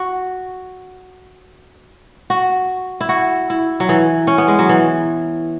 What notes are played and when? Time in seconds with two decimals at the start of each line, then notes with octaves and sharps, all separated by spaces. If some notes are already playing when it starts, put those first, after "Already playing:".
Already playing: F#4
2.30 F#4
3.01 E4
3.09 F#4
3.50 E4
3.80 F#3
3.89 E3
4.27 C#4
4.38 B3
4.48 G#3
4.59 F#3
4.69 E3